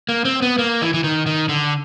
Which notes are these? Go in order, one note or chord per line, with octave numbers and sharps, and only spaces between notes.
A#3
C4
B3
A#3
E3
E3
D#3
D#3
D3